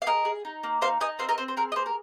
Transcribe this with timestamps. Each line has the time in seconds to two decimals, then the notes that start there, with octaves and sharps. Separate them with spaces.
0.02 F5
0.06 G#4 A#4 D#5
0.25 G#4
0.45 D#4
0.63 A#3
0.81 D#4 C5 F5
1.00 D#4 D#5 G#5
1.19 C4 C5 F5
1.29 A#4 D#5
1.38 C4 C5
1.48 C5
1.57 G#4 A#4
1.72 D#5
1.76 A#3 C5
1.86 A#4